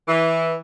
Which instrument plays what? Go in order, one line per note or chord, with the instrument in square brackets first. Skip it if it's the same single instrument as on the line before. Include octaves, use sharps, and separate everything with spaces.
[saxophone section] E3